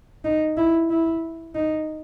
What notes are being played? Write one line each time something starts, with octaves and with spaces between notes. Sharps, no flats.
D#4
E4
E4
D#4